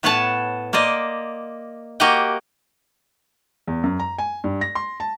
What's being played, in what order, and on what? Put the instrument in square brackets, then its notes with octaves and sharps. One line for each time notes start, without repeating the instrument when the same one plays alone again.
[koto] A2 B3 B4 C#5 F#5 A5
A#3 C5 D5 D#5
A#3 F#4 G4 D#5 F#5 G5
[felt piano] E2
F#2
A#5
G#5
G2
A#6
C6
A5